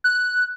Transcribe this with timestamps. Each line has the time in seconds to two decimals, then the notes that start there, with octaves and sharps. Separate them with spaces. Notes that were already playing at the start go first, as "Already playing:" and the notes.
0.04 F#6